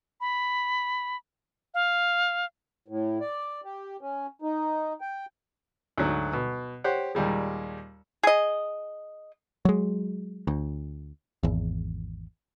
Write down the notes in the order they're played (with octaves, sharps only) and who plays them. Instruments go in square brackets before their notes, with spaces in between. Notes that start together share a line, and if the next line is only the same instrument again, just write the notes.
[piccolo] B5
F5
[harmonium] A2
D5
G4
C#4
D#4
G5
[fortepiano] D2 G#2 F#3
B2
G4 C5 C#5 F#5
D#2 A#2 G3 G#3
[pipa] G#4 D#5
[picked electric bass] F#3 G#3
D2
G#1 E2